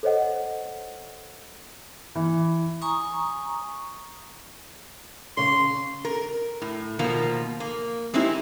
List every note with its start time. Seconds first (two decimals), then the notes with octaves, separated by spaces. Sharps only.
0.03 A4 C5 C#5 D#5 F#5
2.15 E3
2.81 G#5 A#5 C#6 D#6
5.37 C#3 C#5 C6
6.05 A#4
6.62 A2
6.99 B2 D#3 F3 A#3
7.60 A#3
8.14 G#3 C4 C#4 D#4 E4 G4